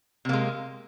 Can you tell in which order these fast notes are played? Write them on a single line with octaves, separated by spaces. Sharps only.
C3 A#3 G#3